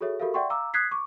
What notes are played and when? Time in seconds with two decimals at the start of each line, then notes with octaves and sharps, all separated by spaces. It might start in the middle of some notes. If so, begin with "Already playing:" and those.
0.01 F#4 G#4 A4 C#5 E5
0.20 F#4 G4 A4 A#4 E5 F5
0.34 D5 E5 F#5 G5 C6 C#6
0.50 F5 A#5 D6 E6
0.74 D#6 F#6 G#6 B6 C7
0.91 C#6 D6